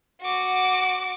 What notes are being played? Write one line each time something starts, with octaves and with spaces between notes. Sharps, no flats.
F#4 D6